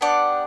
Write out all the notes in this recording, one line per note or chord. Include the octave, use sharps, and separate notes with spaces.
B3 D4 G4 D5 F#5